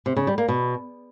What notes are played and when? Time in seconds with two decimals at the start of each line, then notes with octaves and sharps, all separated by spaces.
0.06 C3
0.16 C#3
0.27 G3
0.38 A#3
0.48 B2